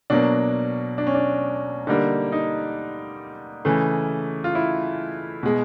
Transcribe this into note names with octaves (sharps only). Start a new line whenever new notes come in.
B2 F#3 A#3 D4
D4
C#4
D4
D3 G3 A#3 D#4
D#4
C#3 E3 A3
F4
E4
B2 G#3